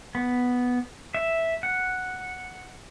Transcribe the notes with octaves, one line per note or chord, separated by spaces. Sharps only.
B3
E5
F#5